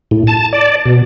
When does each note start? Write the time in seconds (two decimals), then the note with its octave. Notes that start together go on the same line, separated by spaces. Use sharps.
0.11 A2
0.27 A5
0.53 D5
0.85 B2